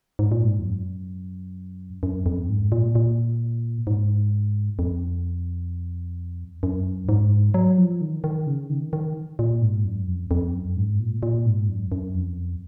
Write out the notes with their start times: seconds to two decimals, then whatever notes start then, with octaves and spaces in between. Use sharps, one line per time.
0.19 G#2
0.32 A#2
0.44 G#2
0.59 F2
0.65 F#2
2.03 F#2
2.26 F2
2.49 G#2
2.72 A#2
2.95 A#2
3.87 G#2
4.79 F2
6.63 F#2
7.09 G#2
7.54 F#3
7.78 F3
8.01 D#3
8.24 D#3
8.47 C#3
8.70 D#3
8.93 D#3
9.39 A#2
9.62 G#2
9.85 F#2
10.08 F2
10.31 F2
10.54 F#2
10.77 G#2
11.00 A#2
11.23 A#2
11.46 G#2
11.69 F#2
11.92 F#2
12.15 F2